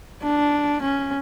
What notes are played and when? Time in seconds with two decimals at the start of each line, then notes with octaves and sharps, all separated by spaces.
0.22 D4
0.82 C#4